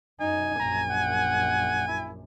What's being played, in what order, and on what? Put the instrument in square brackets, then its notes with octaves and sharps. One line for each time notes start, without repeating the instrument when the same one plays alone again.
[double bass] F#2 D#4 [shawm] G#5
[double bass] A#1 F#2 [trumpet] A#5
[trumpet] F#5
E4